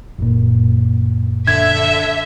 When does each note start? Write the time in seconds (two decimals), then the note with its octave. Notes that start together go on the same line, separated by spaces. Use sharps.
0.18 F#1 A#2
1.47 D3 E5 G#6